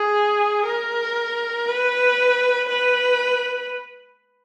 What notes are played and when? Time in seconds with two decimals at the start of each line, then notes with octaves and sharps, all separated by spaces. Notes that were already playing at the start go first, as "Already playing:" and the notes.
Already playing: G#4
0.66 A#4
1.68 B4
2.69 B4